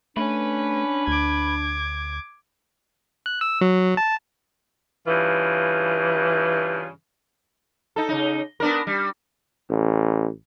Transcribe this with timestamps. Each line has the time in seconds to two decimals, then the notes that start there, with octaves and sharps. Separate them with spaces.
0.17 A3 C#4 D4 B4
1.08 D2 D6 G#6
3.26 F#6
3.41 E6
3.61 F#3
3.97 A5
5.07 G2 C#3 E3 F4
7.96 D#4 A4
8.09 C#3 D#4
8.60 B3 D4 A#4
8.87 G3
9.70 A1